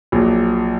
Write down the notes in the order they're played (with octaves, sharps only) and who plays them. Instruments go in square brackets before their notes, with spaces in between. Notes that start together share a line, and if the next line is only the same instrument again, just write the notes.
[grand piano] A#1 A#2 F#3